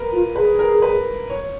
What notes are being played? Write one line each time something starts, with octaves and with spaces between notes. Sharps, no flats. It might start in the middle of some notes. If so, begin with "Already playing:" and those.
Already playing: A#4 B4
F4
G#4 B4
A#4
B4
C#5